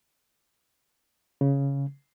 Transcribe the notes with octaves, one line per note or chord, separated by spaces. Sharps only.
C#3